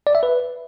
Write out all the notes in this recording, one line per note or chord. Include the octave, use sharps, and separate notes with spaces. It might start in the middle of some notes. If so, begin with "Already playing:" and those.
D5
E5
B4